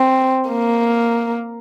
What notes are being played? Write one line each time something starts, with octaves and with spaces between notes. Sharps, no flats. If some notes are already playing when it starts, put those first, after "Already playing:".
Already playing: C4
A#3